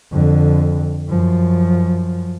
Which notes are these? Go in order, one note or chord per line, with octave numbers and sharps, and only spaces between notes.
F2 D3
F#2 F3